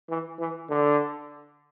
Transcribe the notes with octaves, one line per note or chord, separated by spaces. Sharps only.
E3
E3
D3